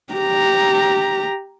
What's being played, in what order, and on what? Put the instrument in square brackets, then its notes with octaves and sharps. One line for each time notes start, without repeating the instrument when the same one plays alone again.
[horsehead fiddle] G4 A#5